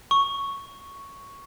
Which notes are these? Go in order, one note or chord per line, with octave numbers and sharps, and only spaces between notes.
C#6